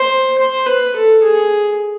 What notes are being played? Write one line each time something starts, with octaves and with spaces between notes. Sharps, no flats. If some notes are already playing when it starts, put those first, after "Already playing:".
Already playing: C5
C5
B4
A4
G#4